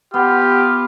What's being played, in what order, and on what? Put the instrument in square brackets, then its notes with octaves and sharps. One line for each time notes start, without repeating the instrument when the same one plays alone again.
[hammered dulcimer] B3 [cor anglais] F4 [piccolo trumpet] G4